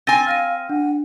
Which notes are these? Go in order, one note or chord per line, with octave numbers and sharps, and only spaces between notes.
C4 G#5 A6 A#6 D#7
F5 F6 A#6 D#7
D4 F#5